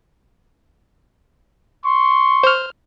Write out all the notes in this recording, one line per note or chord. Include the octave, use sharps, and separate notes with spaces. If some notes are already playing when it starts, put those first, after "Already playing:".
C6 C#6
C5 F6